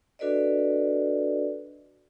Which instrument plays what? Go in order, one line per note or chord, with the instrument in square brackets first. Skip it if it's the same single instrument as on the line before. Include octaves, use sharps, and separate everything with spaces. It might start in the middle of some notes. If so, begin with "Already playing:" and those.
[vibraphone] D4 F#4 A4 B4 D5 D#5